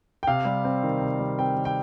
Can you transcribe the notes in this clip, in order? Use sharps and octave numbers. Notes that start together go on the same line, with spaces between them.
G5
C3 F5
G3
C4
D#3
C3
G3
C4 G5
D#3
G5